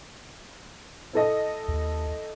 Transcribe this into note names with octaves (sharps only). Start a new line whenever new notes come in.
E4 A4 D#5
D#2